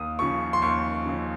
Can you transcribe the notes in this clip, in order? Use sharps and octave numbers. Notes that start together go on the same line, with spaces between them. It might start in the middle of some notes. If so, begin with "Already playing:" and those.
Already playing: D#2 D#6
C#3 F3 C#6
C6
D#2 C#6
C#3 F3